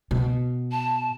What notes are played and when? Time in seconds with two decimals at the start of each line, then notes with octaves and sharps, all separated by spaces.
0.11 B2
0.71 A5